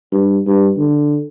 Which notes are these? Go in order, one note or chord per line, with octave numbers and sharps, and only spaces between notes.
G2
G2
D3